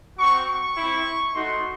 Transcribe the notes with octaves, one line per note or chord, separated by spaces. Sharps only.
C4 F#4 C#6
C#6
C4 E4
A3 D#4 F#4 C6